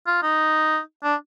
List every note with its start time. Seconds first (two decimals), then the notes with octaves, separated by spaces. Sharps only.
0.07 F4
0.23 D#4
1.04 D4